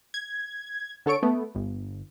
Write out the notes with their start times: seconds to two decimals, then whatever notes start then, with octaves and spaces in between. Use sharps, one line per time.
0.14 G#6
1.06 D3 A4 C#5 C#6 D7
1.23 A3 B3
1.55 G1